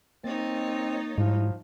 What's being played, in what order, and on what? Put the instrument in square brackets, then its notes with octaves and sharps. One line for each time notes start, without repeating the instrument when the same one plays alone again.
[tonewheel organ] A#3 A6 [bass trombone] C4 [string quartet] D#4 C#5 D#5
[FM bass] G#2 [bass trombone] F3 [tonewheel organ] G3 E4